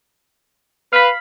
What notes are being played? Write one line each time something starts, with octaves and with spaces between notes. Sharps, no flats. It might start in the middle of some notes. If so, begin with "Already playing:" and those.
B4 F5 B5